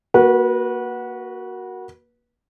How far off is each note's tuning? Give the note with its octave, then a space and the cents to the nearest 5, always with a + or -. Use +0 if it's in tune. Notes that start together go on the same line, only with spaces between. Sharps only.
A#3 +5 F#4 +0 B4 -25